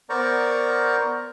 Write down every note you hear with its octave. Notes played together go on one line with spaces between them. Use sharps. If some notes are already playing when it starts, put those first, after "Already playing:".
B3 A#4 C5 D5 A#5 C#6